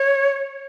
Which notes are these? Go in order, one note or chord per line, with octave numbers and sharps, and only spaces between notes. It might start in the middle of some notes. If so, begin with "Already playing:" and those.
Already playing: C#5